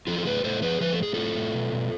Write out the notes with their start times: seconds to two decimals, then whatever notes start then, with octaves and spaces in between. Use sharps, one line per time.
0.07 F3 F4 A4
0.18 A4
0.25 A2 G#4 B4
0.44 A2 A4 C5
0.62 F3 G#4 B4
0.80 F3 B4
0.93 A4
0.99 A2 G#4
1.14 A2 F4 A4
1.35 A2
1.54 B2
1.72 B2